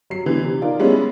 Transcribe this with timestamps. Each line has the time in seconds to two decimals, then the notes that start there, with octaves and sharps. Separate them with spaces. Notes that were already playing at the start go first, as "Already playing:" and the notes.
0.10 F#3 C7
0.26 D3 E3 B3
0.44 C3
0.62 D#4 F4 A#4 D5
0.79 G3 G#3 B3 C#4 E4